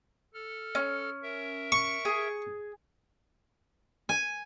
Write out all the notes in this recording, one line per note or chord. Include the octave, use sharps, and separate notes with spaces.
A4 F6
C#4
A#4 E5
C#6
G#4
G#5